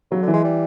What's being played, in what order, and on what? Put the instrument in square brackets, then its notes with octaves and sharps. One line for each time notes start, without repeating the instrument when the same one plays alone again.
[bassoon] C#3 [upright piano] F#3
[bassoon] D3
[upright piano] E3
[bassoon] G#3
G3